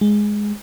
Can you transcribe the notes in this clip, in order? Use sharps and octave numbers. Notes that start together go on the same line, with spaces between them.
G#3